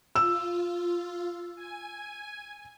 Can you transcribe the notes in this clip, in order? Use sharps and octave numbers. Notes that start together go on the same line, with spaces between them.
F4 E6
G#5